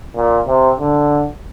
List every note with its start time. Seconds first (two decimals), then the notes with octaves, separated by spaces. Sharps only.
0.16 A#2
0.47 C3
0.78 D3